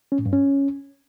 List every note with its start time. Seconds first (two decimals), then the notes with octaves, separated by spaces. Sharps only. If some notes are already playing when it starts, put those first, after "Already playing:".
0.12 C#4
0.19 A2
0.26 G2
0.33 C#4